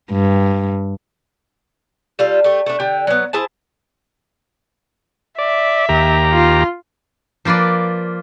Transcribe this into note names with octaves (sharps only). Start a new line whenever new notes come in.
G2
G3 F4 A4
A3 G4
A3 D4
D3 G4 G5
F#3 B3
E4 G#4 C5 A5
D5 E5
D#2 G4 A#5
F4
F3 A#3 F4 B4 D5